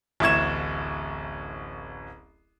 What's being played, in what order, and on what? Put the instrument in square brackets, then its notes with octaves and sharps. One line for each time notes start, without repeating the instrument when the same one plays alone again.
[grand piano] D1 A1 E5 C#6 G#6 E7